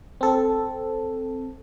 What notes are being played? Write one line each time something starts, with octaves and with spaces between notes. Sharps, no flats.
C4 A4